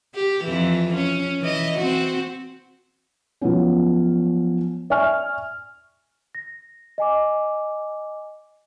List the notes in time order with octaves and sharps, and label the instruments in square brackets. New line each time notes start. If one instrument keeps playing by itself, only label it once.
[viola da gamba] G4
F2 E3
C#4
E3 D#5
C4 F#4
[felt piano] F3 F#3 B3 C#4
D5 E5 G#5 C#6 F6
[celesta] A#6
D#5 G#5 D6